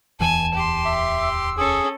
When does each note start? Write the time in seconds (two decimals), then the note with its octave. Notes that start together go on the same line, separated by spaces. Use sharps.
0.20 D1 E2 E3 G#5 A5
0.54 G4 C6
0.85 E5 D6
1.21 E6
1.57 C#4 G#4 A4